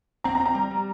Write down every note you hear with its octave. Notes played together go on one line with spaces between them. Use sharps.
C4 A#5
A#5
C4
A#5
G3
G3